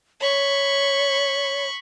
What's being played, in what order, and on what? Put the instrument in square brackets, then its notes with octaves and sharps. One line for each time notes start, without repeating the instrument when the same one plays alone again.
[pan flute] C#5 [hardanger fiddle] B5 C#6